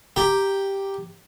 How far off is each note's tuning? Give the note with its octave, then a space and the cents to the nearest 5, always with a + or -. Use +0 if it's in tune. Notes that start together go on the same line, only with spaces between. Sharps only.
G4 +0 A#5 +0